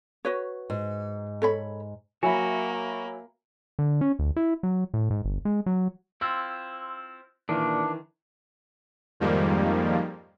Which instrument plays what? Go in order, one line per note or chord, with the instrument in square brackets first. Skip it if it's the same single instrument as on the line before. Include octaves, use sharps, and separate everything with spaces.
[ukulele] F#4 B4 C#5
[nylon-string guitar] G#2
[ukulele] A4 C#5 B5
[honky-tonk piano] F#3 E5 B5 [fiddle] A#3 [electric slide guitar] F#4 [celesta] G#5
[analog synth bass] D3
C#4
D2
E4
F#3
A2
G#2
G1
G#3
F#3
[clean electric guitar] C4 E4 F4 [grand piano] E6
[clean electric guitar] A#2 [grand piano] D#3 E3 [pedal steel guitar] D4
[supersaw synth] F2 G#2 D#3 F3 G3 A#3